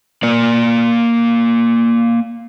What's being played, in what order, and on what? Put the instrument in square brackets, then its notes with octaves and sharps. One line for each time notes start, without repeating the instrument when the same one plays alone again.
[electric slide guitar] A#3 D5